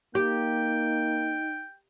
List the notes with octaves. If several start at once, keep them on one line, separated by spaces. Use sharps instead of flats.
A#3 D#4 G4 G5